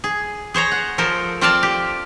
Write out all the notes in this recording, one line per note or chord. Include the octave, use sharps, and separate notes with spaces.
G#4
G#4 C5 C#5 A#5
F#5
F3 A4 A#4 C5
C4 F4 C5 D5 F5 A5
G4